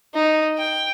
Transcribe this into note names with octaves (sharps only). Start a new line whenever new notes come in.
D#4
G5